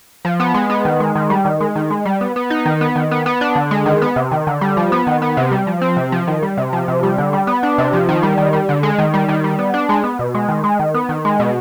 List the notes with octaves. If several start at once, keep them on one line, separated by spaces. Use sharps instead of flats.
F3
B3
G#3
B3
D#3
G#3
D#3
G3
D#3
G#3
D#3
G#3
G3
B3
B3
D#4
D#3
B3
D#3
B3
B3
D4
D3
G#3
D#3
B3
C3
D#3
D3
G3
F3
B3
D#3
B3
C3
G3
F3
C4
C3
F3
D#3
G3
C3
F3
C3
G3
D3
G3
B3
D4
C3
F3
D#3
G3
D#3
G3
D3
G#3
D#3
G3
D#3
G3
B3
D4
G#3
B3
B2
G#3
D#3
G#3
D#3
B3
D#3
G#3
B2